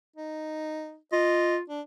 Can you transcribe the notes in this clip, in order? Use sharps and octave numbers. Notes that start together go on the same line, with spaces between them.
D#4
F4 D#5
D4